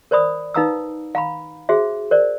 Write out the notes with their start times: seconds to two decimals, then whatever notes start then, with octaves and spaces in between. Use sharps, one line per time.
0.11 A#4 C5 D5 B5 D#6
0.54 D#4 B4 F5 A#5 D#6 E6
1.15 F5 A#5 B5
1.69 F#4 G#4 C5 E5
2.11 A#4 C5 D5